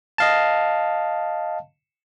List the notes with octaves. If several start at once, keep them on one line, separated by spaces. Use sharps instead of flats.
D#5 F5 A5